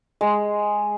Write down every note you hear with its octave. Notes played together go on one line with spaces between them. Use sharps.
G#3